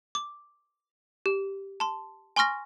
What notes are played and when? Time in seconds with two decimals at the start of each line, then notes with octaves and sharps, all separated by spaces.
0.15 D6
1.26 G4
1.80 A5 C6
2.36 G#5 C6 C#6 F6 A#6